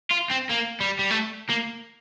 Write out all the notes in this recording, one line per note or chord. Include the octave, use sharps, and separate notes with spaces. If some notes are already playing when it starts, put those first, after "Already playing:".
F4
C4
A#3
G3
G3
A3
A#3